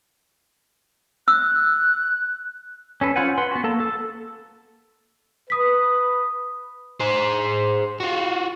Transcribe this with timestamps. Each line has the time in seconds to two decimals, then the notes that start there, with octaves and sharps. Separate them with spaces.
1.28 E6 F#6
3.01 C#4 A4 B4
3.16 C#4 F4 C5 F#5 G#5
3.38 B4 F#5 C6
3.51 B3 F#4
3.64 A#3 A4 A5
3.80 A4
5.50 B4 D#6 B6
7.00 G#4 C5
8.00 F4 F#4